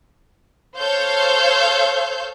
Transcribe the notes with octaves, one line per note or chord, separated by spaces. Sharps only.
A4 C5 C#5 F5 G6